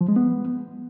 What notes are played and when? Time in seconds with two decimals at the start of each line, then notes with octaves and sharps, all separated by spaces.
0.01 F3
0.08 G#3
0.16 B3